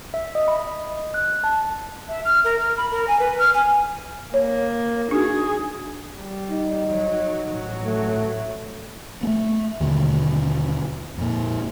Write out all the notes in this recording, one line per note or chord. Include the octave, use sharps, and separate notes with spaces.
E5
D#5
B5
D#5
F#6
A5
E5
F6
A#4
F6
B5
A#4
G#5
B4
F6
G#5
A#3 C#5
D4 D#4 F#4 G#4
G3
D#4
F#3
A1 F#3
A3
A3 B3
D#2 B2 D3
F2 A#2